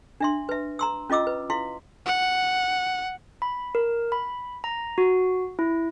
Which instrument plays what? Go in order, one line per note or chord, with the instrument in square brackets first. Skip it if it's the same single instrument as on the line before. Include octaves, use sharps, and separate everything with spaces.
[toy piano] D4 E5 C6
B4 E5
A#5 C6 E6
C#4 F4 D#5 D6 E6
B4
E4 F5 C6
[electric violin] F#5
[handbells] B5
A#4
B5
A#5
F#4
E4